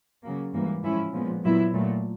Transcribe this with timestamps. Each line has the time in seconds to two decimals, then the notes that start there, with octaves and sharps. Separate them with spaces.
0.24 C#3 F#3 A#3
0.53 G#2 E3 G3 A#3
0.83 A2 F3 G#3 C#4 E4
1.13 A#2 F3 G#3 B3
1.43 A#2 F#3 B3 E4
1.73 A#2 F#3 A3